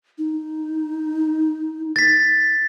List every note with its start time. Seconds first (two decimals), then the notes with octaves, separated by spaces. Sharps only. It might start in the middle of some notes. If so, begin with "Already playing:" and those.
0.18 D#4
1.96 A6 B6